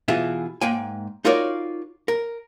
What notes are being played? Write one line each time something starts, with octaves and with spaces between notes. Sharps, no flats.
B2 E3 F4 G#4 E5
G#2 A#3 G5 G#5
D#4 F4 F#4 A#4 C#5 D5
A#4